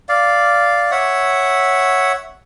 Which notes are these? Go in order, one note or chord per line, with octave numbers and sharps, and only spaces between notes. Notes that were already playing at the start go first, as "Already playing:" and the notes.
D5 F5
C#5 E5 F#5